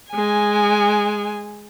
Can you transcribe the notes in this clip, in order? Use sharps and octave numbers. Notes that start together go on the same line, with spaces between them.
G#3 G#5